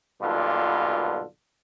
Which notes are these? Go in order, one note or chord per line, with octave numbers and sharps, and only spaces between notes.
B1 G2 A#2 D3 F4